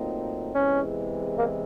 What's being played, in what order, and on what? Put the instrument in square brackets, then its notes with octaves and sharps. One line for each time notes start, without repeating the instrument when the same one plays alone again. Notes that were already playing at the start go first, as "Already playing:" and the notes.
Already playing: [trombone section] A#2 F#3 A3 C4 D#4
[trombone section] E2 C3 E3 G#3 [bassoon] C#4
[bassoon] A#3